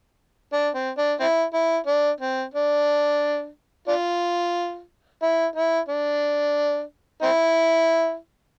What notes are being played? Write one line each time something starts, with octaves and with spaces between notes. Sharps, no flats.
D4
C4
D4
C4 E4
E4
D4
C4
D4
D4 F4
E4
E4
D4
C4 E4